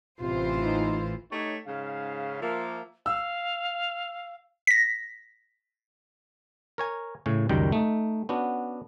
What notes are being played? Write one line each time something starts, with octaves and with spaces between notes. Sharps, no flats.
A1 C3 E3 F4 C5
D#4
A3 D#4 G4 C#5
G#2 C#3 F5
F3 A#3 E5
F5 E6
A#6 B6
A#4 C#5 G#5
A2 C#3 C#4
C#2 F#2 D#3 G3 G5
A3 D#4
B3 C#4 D4 F#4